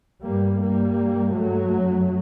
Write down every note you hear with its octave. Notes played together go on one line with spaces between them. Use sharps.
G2 G3 A#3
G2 G3 A#3
G2
G2 F#3 A3
F#2